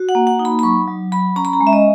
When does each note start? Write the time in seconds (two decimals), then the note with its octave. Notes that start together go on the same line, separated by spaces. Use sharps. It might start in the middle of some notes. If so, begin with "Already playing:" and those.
Already playing: F#4
0.09 F#5
0.15 A#3
0.27 F#5
0.39 D#4
0.45 B5
0.59 B5
0.63 F#3 C#6
0.88 F#3
1.12 F#3 B5
1.36 C#4 A#5
1.45 B5
1.53 A#5
1.61 G#3
1.67 E5
1.73 D#5